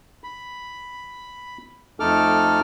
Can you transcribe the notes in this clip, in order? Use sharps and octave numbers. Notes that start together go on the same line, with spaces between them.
B5
F2 A3 D#4 A4 D6 F6